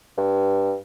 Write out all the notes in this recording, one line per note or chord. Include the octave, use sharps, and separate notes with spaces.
G2